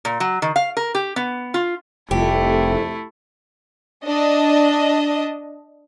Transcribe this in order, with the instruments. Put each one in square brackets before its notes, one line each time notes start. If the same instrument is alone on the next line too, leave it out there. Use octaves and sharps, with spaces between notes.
[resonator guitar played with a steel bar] A#2
F#3
D#3
F5
A#4
G4
B3
F4
[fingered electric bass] F1 [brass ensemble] C2 F2 [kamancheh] A3 E4 [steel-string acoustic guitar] G4
[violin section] D4 D#5